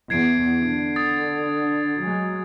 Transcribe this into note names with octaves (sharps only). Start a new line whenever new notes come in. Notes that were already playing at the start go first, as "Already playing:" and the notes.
E2 G#6 C7 D7
D3
D#6 A6
F#3 G#3